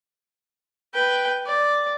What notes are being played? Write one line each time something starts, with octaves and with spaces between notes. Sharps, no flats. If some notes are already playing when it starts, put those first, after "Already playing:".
B4 G5
D5